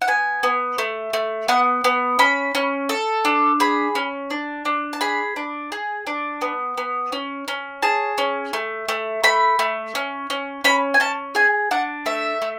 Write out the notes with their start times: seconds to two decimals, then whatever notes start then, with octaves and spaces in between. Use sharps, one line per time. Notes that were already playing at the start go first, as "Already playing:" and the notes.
0.02 F#5
0.08 B3 G#5
0.43 B3
0.78 A3
1.13 A3
1.48 B3 F#5
1.84 B3
2.19 C#4 B5
2.55 C#4
2.89 A4
3.25 D4
3.60 G#4 B5
3.95 C#4
4.30 D4
4.65 D4
4.93 A5
5.01 G#4 B5
5.36 D4
5.72 G#4
6.07 D4
6.41 B3
6.78 B3
7.12 C#4
7.48 C#4
7.82 G#4 A5
8.18 C#4
8.53 A3
8.89 A3
9.24 A3 B5
9.59 A3
9.95 C#4
10.30 C#4
10.64 C#4 B5
10.94 G#5
11.00 C#4 A5
11.35 G#4 G#5
11.71 D4 F#5
12.06 A3 E5
12.42 A3